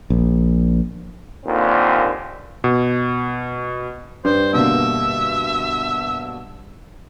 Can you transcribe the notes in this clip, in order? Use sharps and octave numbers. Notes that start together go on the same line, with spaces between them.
A#1
D#2 A#2 D3 C4
B2
G2 C5
B2 D3 A#3 E5